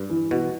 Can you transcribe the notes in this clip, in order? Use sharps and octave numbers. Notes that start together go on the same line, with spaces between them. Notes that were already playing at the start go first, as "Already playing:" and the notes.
Already playing: G2
E3
B2 F#4